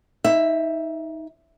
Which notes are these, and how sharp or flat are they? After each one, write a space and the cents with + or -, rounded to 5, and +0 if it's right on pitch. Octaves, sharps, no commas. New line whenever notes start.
D#4 +25 E5 +5